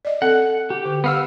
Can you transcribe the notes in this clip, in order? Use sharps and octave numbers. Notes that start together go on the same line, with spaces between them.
D5 D#5
C4 A4 F#5
G4
D3
B3 G4 F5 F#5 E6